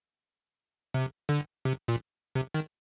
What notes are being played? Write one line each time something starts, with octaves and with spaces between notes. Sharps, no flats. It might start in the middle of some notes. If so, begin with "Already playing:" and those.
C3
D3
C3
A#2
C3
D#3